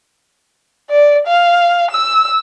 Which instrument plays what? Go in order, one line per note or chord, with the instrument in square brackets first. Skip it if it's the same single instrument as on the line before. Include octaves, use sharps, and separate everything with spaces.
[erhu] D5
F5
E6